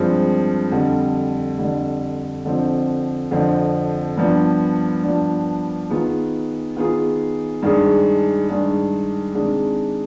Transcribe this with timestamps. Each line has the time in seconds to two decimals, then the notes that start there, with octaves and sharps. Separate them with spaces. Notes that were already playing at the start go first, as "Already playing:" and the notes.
Already playing: G2 F3 G#3 C4
0.72 F2 D3 G3
1.58 F2 D3 G3
2.45 F2 D3 F3 C4
3.31 F2 D3 F3 C4
4.17 G2 F3 B3 D4
5.03 G2 F3 B3 D4
5.90 D#3 B3 F4 G#4
6.77 D#3 B3 F4 G#4
7.62 G2 D#3 G#3 D4 G#4
8.48 G2 D#3 G#3 D4 G#4
9.35 C3 D#3 G#3 D4 G#4